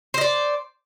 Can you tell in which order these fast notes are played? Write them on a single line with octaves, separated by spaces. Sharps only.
C5 D#5 D5